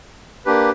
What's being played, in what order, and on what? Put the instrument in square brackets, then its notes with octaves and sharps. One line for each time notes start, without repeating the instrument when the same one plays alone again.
[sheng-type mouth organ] A#3 D4 G4 B4